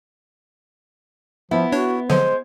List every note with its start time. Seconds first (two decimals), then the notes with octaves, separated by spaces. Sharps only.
1.51 F3 B3 E4
1.72 D4 F#4 C#5
2.10 D3 F3 F#3 G#3 C5